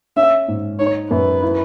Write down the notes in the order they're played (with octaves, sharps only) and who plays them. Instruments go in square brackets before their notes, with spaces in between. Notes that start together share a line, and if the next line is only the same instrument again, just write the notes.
[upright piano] C#4 [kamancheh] E5
[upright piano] G#2
[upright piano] D#4 [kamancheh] C#5
[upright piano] F#2 [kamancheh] B4
[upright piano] E4